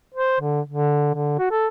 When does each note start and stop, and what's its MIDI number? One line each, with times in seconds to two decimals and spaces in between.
0.15 0.39 72
0.40 0.60 50
0.69 1.13 50
1.15 1.36 50
1.39 1.49 66
1.51 1.67 69